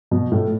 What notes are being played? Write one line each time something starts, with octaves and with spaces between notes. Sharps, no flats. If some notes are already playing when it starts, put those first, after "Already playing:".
B2
A2